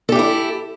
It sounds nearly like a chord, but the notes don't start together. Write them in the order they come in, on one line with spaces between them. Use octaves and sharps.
A4 G4 E5 E4